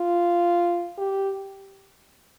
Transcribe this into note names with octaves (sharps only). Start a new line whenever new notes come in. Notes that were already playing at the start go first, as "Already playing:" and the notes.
Already playing: F4
G4